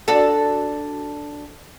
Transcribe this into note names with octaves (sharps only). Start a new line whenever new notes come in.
D4 F#4 A4